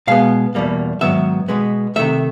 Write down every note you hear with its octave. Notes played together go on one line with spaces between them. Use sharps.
B2 G#3 B3 F5
E2 B2 G3 A#3
G#2 D#3 F#3 B3 E5
B2 G#3 B3
C3 D#3 F#3 A3 E5